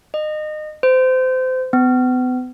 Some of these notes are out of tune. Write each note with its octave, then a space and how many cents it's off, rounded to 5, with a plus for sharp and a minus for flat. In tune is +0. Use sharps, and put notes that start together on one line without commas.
D#5 -25
C5 -25
B3 +35